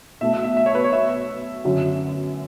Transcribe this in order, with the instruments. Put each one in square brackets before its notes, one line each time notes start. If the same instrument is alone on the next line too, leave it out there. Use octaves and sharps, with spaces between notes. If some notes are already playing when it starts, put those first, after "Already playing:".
[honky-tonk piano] B1 B2 A3 [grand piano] E5
[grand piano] E5
E5
E5
C#5
B4
C#5
E5
[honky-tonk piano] F#2 D3 F#3 C#4 F#4